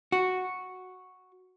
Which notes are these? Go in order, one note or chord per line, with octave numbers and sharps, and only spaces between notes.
F#4